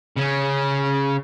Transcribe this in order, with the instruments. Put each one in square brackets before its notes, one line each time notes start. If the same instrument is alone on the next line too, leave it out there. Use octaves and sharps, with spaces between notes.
[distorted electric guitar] C#3 C#4